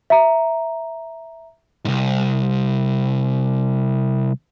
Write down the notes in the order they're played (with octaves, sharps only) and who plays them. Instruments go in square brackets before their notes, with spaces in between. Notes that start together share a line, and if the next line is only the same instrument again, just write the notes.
[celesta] E5 A#5
[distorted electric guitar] C2 G#2